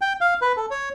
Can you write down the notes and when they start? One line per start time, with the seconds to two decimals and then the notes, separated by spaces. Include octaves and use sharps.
0.01 G5
0.21 F5
0.42 B4
0.57 A4
0.71 C#5